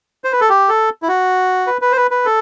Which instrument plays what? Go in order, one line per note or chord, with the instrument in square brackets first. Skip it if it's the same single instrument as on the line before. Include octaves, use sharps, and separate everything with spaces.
[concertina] C5
B4
A4
G4
A4
E4
F#4
B4
B4
C5
B4
B4
A4